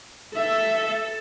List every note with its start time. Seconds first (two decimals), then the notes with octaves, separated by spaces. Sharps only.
0.35 A4 E5